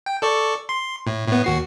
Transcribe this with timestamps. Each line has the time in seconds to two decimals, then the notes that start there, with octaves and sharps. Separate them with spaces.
0.06 G5
0.22 A4 D5 C#6
0.69 C6
1.07 A2
1.28 A2 B3
1.44 D#2 F#4 C7